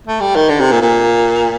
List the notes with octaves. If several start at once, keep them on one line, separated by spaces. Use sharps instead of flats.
A3
G3
D#3
D3
C3
A#2
A#2